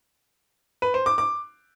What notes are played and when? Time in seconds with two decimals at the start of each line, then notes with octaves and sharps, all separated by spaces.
0.82 B4
0.94 C5
1.06 D6
1.18 D6